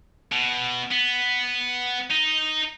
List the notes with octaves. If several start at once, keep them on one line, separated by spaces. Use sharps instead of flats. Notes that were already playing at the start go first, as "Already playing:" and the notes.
B2
B3
D#4